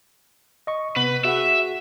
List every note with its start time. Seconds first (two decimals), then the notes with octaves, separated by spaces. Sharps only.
0.67 D#5 C#6
0.96 C3 B3 B4
1.25 F#4 G#4 E5 F#5